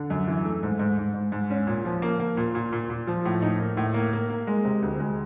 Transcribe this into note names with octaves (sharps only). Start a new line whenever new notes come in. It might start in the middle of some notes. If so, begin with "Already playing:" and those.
Already playing: D3
F#2
E3
A3
G#2
G#2
G#2
G#2
G#2
C#4
A#2
F3
A#3
A#3
A#2
A#2
A#2
A#2
F3
A2
D#4
A#3
A2
A#3
A#3
A#3
G#3
C3
D2
G#3